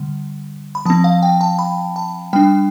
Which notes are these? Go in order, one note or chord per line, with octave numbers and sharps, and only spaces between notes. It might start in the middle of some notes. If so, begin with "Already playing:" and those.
Already playing: D3 G3
B5
F3 C4 A5
F5
G5
A5
B5
A5
G3 D4 G5